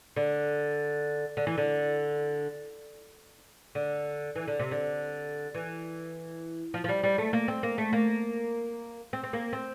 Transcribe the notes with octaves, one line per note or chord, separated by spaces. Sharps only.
D3
D3
E3
D3
D3
E3
D3
C3
D3
E3
F3
F3
G3
G3
A3
A#3
C4
A#3
A3
A#3
C4
C4
A#3
C4